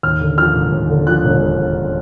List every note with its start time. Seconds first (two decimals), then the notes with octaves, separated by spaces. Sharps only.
0.03 D#2 F6
0.21 D3
0.38 F3 F6
0.56 E1
0.72 D#2
0.90 D3
1.07 F3 F#6
1.24 E1